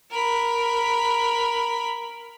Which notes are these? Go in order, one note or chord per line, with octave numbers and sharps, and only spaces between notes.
A#4 B5